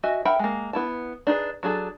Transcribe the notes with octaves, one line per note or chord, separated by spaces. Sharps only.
F#4 D#5 E5 G#5
A#4 E5 F#5 G5 B5
G#3 A#3
B3 E4 A5
D4 D#4 G#4 B4
F#3 D4 G#4 A4